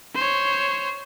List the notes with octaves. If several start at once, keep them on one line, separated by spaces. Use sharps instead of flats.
C5 C#5